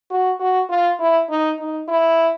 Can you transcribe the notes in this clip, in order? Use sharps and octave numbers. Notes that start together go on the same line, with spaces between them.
F#4
F#4
F4
E4
D#4
D#4
E4